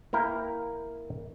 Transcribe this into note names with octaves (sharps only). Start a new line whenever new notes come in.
A#3 E4 A#4 G5